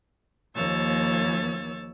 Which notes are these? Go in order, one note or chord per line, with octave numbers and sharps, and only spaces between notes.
D#2 F3 A#3 C#5 E6 A6